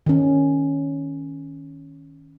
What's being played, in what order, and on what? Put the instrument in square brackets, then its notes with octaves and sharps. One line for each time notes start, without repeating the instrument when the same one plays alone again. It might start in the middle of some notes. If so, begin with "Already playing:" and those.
[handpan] D#3 C#4